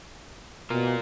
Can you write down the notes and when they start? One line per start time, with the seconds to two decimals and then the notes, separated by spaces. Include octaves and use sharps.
0.70 B2 F4 A#4